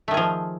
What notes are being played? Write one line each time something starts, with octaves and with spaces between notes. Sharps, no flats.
D#3 F3 A3 G#4